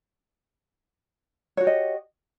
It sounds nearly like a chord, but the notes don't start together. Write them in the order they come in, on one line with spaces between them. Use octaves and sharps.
C#5 F#4 G4 D#5